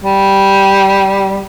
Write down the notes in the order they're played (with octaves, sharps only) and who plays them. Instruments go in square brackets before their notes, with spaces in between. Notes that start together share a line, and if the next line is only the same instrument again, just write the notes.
[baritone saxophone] G3